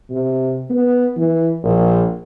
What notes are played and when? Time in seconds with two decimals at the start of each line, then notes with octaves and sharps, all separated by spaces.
0.10 C3
0.70 B3
1.17 E3
1.63 A#1